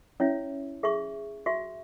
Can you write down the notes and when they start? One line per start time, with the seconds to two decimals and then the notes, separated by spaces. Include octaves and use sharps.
0.20 C#4 E4 C#5 E5
0.83 G#4 E5 C#6
1.46 F#4 E5 C#6